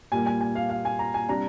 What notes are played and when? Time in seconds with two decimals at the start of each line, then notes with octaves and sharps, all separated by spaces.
0.12 A#2 G3 A#3 G#5
0.27 G#5
0.41 G#5
0.55 F5
0.70 F5
0.85 G#5
0.99 A#5
1.14 G#5
1.29 C3 G3 D4 A#5